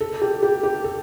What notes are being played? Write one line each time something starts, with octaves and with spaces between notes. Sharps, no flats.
A4
G4
G4
G4
A4